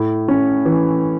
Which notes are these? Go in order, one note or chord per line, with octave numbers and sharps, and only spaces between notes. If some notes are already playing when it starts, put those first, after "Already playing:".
Already playing: A2
C#4
E3